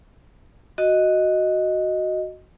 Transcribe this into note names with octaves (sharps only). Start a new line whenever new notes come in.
F#4 D#5